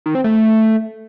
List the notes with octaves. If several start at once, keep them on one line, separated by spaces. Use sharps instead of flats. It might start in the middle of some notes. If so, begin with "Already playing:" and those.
D#3
C4
A3